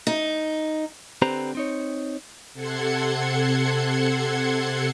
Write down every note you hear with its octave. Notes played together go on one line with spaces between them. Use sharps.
D#4
D3 C4 G4 B4 C5 A#5
C4 D#4 C#5
C3 A4 F#5 C6 G#6 C#7